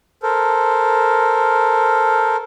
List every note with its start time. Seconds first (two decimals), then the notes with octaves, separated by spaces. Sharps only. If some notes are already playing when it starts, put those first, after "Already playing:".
0.23 A4 A#4 C5